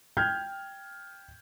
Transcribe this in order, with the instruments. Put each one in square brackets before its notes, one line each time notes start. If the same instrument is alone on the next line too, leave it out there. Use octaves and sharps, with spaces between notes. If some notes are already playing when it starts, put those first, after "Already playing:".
[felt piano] G5 F6 G6 G#6